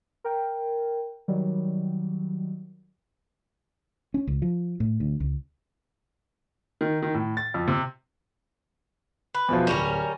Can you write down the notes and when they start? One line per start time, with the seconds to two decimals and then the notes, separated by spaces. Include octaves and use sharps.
0.24 A#4 G5
1.28 D#3 F#3 G3
4.14 C#4
4.27 C#2
4.42 F3
4.80 A2
5.00 D2
5.20 C#2
6.81 D#3
7.02 D#3
7.14 A2
7.37 A6
7.54 F2
7.68 C3
9.34 B4
9.49 E2 B2 F3
9.67 D1 G3 C#4 A#4